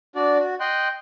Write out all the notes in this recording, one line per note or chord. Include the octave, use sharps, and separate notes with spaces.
D4 F#4 D5
F#4
D#5 G5 C6 F#6